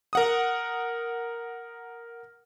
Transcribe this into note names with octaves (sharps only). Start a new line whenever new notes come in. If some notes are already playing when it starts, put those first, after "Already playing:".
A#4 F#5 D#6